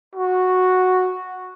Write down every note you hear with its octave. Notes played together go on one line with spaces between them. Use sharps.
F#4